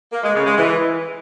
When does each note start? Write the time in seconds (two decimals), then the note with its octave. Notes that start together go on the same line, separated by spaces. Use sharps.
0.12 A#3
0.23 G#3
0.35 C#3
0.46 G#3
0.58 E3